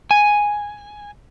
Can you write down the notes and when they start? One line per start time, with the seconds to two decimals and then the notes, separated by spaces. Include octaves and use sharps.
0.11 G#5